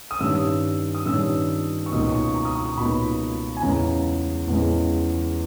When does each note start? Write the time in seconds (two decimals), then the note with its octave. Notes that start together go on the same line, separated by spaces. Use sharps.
0.11 D#6
0.20 G2 D#3 G3 C#4 E6
0.95 D#6
1.06 G2 D#3 G3 C#4 E6
1.86 C#6
1.91 C#2 B2 A#3 D#4 D#6
2.12 C#6
2.35 A#5
2.45 D#6
2.55 C#6
2.78 C#2 B2 A#3 D#4 B5
3.57 G#5
3.62 E2 C#3 G#3 A#5
4.48 E2 C#3 G#3